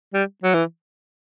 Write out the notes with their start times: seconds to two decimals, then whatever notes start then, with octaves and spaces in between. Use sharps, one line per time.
0.14 G3
0.44 F#3
0.54 E3